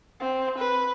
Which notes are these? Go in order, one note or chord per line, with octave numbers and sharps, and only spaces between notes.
C4
B4